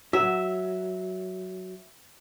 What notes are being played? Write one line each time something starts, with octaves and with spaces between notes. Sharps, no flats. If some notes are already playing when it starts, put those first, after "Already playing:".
F#3 E5